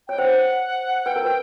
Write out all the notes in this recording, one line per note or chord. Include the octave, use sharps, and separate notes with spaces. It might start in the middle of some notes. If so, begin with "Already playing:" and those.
C#5 G5
C5 F#5
B4 G5
A#4
B4